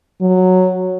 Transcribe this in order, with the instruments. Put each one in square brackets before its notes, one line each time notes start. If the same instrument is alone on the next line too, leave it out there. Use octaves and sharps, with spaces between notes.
[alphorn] F#3